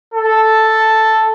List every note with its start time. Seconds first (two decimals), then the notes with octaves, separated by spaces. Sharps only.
0.14 A4